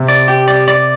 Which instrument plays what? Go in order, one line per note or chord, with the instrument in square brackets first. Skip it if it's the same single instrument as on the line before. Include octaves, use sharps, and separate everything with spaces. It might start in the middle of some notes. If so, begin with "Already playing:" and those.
Already playing: [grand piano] C3
[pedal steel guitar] D5
G4
D5
D5